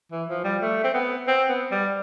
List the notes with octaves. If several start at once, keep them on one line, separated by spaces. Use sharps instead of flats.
E3
F3
G3
A3
C4
B3
C4
B3
G3